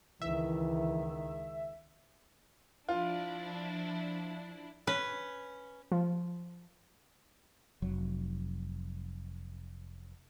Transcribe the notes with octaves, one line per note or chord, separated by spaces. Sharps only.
C#2 D#3 E3 E5
F3 D4 E4 F4
C#4 B4
F3
F1 F#3